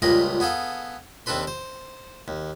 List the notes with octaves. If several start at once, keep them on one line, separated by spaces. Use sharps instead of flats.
C#2 G2 A#2 A#4 D#5 B5
B3 G#4 A4 F5
D#2 C4 D4 A4 B4 C6
C5
D#2